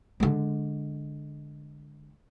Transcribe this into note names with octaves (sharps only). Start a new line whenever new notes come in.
D3 G#3